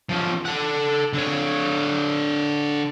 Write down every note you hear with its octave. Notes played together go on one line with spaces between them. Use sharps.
F3 C#4
A4 F#5
D3 C#5